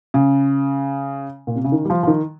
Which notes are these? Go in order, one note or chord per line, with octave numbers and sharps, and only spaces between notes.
C#3
A#2
C3
C#3
D#3
G3
F3
F3
D#3